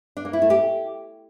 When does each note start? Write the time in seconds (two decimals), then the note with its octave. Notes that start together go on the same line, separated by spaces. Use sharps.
0.17 D4
0.25 A#3
0.33 E4
0.42 A3
0.50 G4